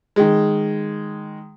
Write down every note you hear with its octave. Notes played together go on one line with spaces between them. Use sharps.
D#3 G#3